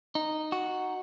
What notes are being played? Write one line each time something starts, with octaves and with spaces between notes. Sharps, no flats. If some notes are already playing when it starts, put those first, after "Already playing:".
D#4
F#4